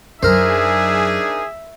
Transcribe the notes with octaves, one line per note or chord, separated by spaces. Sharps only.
F#2 F#3 D4 D#4 G#4 A#4 C5 E5